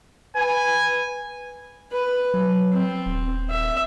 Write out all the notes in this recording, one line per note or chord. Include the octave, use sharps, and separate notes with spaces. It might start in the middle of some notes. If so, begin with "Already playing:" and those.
B4 G#5
B4
F#3
C4
D#1
E5